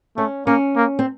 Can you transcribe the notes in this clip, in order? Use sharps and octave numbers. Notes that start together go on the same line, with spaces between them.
A3 C#4
A#3 C#4
A#3
C4